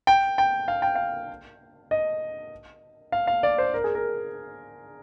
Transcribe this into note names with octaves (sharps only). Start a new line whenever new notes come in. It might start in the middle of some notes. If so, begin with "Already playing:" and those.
G5
G5
F5
G5
F5
D#5
F5
F5
D5
C5
A#4
G#4
A#4